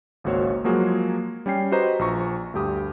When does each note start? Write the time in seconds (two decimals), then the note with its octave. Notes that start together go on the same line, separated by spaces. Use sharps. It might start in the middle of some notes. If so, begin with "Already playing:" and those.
0.24 G#1 C#2 A#3 F#4 C5 C#5
0.64 F3 F#3 G#3 A#3 F#4 G#4
1.46 G3 C#4 G5 C7
1.72 F#4 G4 B4 C5 D#5 A#5
1.99 A#1 F4 A#5 C#6
2.54 D2 G2 G4 D#6